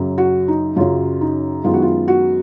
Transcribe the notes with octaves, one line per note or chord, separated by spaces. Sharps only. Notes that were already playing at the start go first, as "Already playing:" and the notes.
Already playing: F#2 C#3 F#3
F#4
D#4
F#2 C#3 F#3 F4
D#4
F#2 D#3 G#3 B3 F4
F#4
F4
F#4